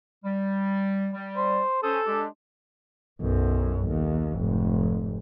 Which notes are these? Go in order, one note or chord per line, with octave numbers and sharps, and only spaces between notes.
G3
G3
C5
C#4 A4 C5 D#6
G#3 D4 G4
B1 F#2
D#2
F1 G#2